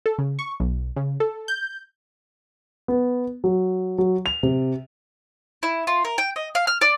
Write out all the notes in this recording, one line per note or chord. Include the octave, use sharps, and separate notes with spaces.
A4
C#3
C#6
B1
C#3
A4
G6
B3
F#3
F#3
F7
C3
E4
F4
A#4
G5
D#5
F5
F6
D5